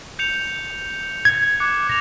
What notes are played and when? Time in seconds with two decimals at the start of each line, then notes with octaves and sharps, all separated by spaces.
0.19 G6 C#7 F7
1.25 G#6
1.60 D6 F#6 C#7
1.87 D6 A#6 F7